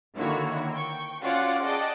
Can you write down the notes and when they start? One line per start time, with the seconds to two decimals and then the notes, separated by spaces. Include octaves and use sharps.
0.16 D3 D#3 A#3 E4 F#4 C#5
0.72 G5 C#6
1.22 C#4 F4 F#4 D5 F5 F#5
1.63 G#4 D5 D#5 F#5 G5 A5